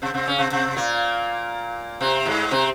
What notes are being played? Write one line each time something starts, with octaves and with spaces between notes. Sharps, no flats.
C3 C4
C3 C4
C#3 C#4
C3 C4
C3 C4
A#2 A#3
C3 C4
G#2 G#3
C3 C4